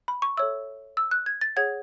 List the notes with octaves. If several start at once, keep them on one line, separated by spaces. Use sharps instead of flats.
B5
C#6
A4 C#5 E5 E6
E6
F#6
G#6
A6
G#4 C#5 F#5 G#6